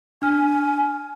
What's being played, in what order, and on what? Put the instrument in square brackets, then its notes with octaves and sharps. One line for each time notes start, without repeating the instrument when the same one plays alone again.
[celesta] D4 F6 [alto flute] G#5